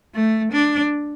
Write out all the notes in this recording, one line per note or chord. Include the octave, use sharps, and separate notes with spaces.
A3
D4